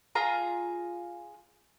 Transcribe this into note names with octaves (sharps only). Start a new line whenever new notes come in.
F4 G#4 A#5